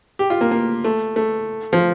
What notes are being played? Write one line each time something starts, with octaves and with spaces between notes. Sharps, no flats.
G4
F4
A#3
A#3
A3
A3
F3